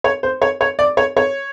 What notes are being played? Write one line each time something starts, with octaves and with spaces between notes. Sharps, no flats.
C#5
C5
C#5
C#5
D5
C#5
C#5